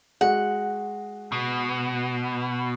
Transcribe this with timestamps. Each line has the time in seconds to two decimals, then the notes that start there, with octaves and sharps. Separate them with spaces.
0.21 G#3 F#4 F#5
1.32 B2